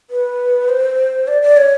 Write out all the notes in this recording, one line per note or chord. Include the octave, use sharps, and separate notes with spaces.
B4
C5
D5
D5
C#5